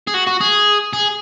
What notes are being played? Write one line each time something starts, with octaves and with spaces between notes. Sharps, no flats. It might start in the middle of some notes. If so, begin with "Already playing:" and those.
G#4
F#4
F#4
G#4
G#4